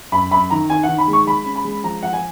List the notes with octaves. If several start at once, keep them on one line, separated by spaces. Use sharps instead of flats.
F#2 B5
F#2 B5
D#3 A#5
D#3 G#5
F#5
D#3
B5
G#3
C#6
G#3 B5
C#4
B5
G#3
F3 A#5
F3 F#5
G#5